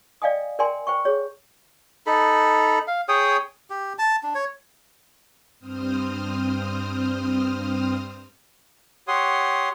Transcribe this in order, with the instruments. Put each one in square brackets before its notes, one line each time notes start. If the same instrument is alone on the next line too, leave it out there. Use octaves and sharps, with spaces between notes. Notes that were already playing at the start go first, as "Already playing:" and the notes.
[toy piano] D5 D#5 F5 G5 G#5 D#6
A#4 D5 G5 G#5 C6
C5 G5 C#6
G#4 C#5
[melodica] D#4 A4 B5
F5
G#4 C#5 G5 D#6
G4
A5
D4
C#5
[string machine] G2 C4 C5 D#6 F6
[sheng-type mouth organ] G4 C#5 F#5 C6 D#6